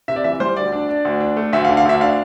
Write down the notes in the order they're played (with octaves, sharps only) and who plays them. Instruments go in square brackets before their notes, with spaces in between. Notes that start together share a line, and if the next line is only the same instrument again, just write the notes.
[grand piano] C3 E5
D5
E3 E5
G3 C5
D2 D5
D4
D4
D2
D4
A3
D2 E5
F5
D3
F5
D2 E5
D4 F5